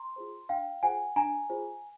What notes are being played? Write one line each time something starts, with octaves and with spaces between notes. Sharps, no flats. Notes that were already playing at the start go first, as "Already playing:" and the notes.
Already playing: A#5 C6
F4 G#4 C5
D4 F5 G5
F4 G#4 C5 F#5 G#5
D4 G#5 A#5
F4 G#4 C5